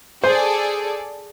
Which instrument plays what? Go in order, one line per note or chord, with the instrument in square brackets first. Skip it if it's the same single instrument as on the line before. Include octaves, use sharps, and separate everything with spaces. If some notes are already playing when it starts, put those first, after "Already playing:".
[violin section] G#4 A4 D5 [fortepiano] C5